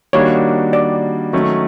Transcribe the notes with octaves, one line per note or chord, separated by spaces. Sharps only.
D#3 G3 A#3 D4 F#4 C#5
D5
D#3 F#3 A3 C#4